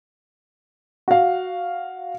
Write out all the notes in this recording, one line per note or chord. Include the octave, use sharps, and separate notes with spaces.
F#4 F5